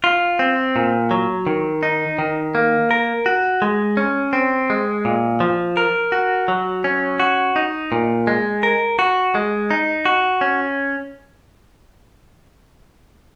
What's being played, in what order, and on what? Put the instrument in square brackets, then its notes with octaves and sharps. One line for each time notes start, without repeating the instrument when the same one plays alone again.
[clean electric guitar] F4
C4
A#2
F#3
D#3
D#4
D#3
A#3
A#4
F#4
G#3
C#4
C4
G#3
A#2
F3
A#4
F#4
F#3
C#4
F#4
D#4
A#2
G#3
A#4
F#4
G#3
D#4
F#4
C#4